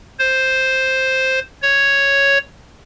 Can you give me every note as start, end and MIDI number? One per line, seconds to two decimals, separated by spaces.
0.19 1.39 72
1.62 2.38 73